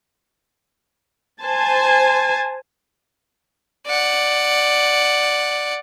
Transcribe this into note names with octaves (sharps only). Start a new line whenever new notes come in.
C5 G#5 A5
D5 F#5